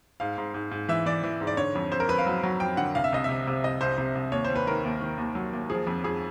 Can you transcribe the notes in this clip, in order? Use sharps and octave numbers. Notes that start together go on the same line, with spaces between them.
G#2 F5
G#2
G#2
G#2
E3 E5
E3 D5
E3
G#2
D5
D3 C#5
F2
F2 C5
A#4
F2 B4
F5
F#3
F#3
F2 G5
D3 F#5
C2 F5
E5
C2 D#5
C3 E5
C3
C2 D#5
C2 C5
C3 C5
C2
D#2 C#5
C5
D#2
B4
D#3 A#4
D#2
D#3
D#2
F#3
D#2
F3 G#4
F2
F2 G#4